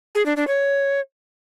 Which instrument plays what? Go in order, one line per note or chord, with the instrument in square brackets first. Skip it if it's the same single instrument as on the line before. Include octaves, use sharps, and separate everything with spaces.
[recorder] G#4
D4
D4
C#5